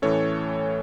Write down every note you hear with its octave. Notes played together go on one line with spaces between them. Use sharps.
A2 E3 A3 C#4 A4 C#5